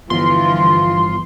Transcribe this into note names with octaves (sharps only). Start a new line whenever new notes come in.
G1 E3 F3 F4 C6